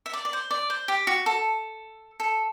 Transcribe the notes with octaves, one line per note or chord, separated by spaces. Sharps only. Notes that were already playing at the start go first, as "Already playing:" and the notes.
E5
D5
D5
C5
D5
C5
G4
F#4
A4
A4